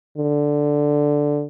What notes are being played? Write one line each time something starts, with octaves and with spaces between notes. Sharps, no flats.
D3